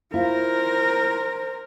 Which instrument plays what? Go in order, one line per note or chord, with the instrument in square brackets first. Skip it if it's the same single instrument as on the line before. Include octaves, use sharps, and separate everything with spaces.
[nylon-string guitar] E4 F4 [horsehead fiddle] A#4 [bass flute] C5